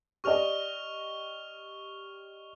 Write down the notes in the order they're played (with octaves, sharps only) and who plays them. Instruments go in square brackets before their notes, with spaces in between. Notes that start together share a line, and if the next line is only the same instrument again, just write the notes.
[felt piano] G4 D5 D#5 [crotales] C#6 F6 F7